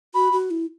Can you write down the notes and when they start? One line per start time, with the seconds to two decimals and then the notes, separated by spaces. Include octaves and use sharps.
0.14 F#4 B5
0.33 F#4
0.51 E4